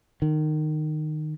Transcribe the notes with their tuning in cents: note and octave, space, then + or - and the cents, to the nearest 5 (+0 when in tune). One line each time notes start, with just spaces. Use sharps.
D#3 -20